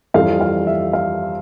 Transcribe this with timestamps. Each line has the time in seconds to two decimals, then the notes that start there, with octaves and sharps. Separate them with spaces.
0.14 F2 E3 G3 F5
0.41 F5
0.67 E5
0.93 F5